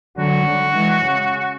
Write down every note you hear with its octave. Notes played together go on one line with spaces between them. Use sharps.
D3 F#3 F#4
D3 F#3
E3 G#3
C#3